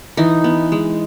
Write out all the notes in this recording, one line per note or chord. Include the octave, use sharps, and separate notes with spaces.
E3 D#4
B3
G#3